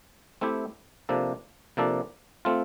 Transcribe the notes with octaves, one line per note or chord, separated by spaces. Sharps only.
A3 C4 E4 G4
C3 F3 A#3 D4 A4
C3 F3 A#3 D4 A4
A3 C4 F4